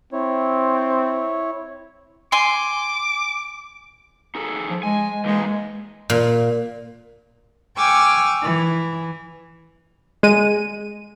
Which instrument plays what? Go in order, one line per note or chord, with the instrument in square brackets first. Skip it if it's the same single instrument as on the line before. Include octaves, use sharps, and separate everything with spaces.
[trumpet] C4 [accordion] E4 C#5
[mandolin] G#5 C6 [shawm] D6
[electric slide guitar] D#4 G#4 A4
[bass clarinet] F3
[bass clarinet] G#3 [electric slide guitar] G#5
[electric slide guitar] E3 A#3 D#4 [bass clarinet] G#3
[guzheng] A#2
[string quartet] G5 G#5 C#6 D6 E6 F6
E3
[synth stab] G#3 D#7